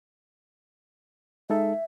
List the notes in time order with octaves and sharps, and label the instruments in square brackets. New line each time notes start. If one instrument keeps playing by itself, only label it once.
[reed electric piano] G#3 D#4 A4 [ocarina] E5